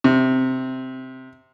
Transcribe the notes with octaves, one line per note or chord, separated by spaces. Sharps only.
C3